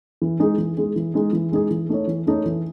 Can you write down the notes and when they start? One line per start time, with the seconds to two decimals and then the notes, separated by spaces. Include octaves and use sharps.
0.22 E3
0.40 G#3 D#4 G#4
0.58 E3
0.77 G#3 D#4 G#4
0.96 E3
1.14 G#3 D#4 G#4
1.33 E3
1.52 G#3 D#4 G#4
1.71 E3
1.89 A3 D#4 A4 C#5
2.07 E3
2.27 A3 D#4 A4 C#5
2.46 E3